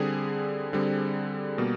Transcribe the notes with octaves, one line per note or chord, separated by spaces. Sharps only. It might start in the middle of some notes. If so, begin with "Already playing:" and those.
Already playing: D3 G3 C4 G#4
D3 G3 C4
B2 G3 A#3